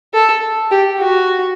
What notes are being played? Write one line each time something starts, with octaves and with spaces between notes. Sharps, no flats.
A4
G4
F#4